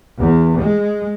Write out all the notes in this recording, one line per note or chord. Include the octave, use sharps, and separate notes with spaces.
E2
G#3